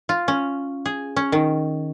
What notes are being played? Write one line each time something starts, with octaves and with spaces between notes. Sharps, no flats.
F4
C#4
G#4
C#4
D#3